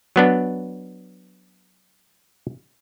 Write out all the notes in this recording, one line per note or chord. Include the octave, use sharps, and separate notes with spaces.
F#3 B3 D4